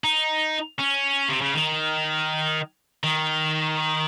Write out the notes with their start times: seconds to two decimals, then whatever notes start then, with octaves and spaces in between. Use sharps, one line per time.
0.04 D#4
0.79 C#4
1.28 C3
1.41 C#3
1.54 D#3
3.04 D#3